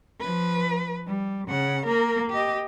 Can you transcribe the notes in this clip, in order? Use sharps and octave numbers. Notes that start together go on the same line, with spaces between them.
F3 B4
G3
C#3 F#5
A#3 A#4
G4 D#5